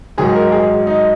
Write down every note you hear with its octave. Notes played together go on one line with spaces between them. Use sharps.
G#2 D#3 F#3 G#4
A#4
G#4
D#4